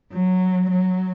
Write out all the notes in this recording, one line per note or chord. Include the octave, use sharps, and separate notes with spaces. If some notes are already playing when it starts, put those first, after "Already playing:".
F#3
F#3